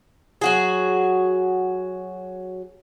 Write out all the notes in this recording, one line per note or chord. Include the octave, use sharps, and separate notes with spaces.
F#3 F#4 G#4